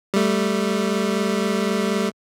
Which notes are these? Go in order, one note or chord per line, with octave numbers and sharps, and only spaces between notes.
G3 A3